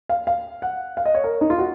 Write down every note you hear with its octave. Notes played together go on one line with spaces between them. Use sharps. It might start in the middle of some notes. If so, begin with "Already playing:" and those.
F5
F5
F#5
F5
D#5
C#5
A#4
D#4
F4
F#4